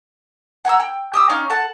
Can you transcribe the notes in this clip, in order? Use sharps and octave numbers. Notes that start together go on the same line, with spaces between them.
F#5 G#5 A#5 E6
G5
G4 D#6 E6
C#4 D#4 F5 F6
A4 F#5 A5